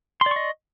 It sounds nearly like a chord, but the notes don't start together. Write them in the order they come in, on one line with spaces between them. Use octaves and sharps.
C6 D5 C#6 D#5